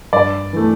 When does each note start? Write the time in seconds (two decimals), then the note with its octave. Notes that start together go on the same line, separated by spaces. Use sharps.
0.13 G2 D5
0.53 E3 A3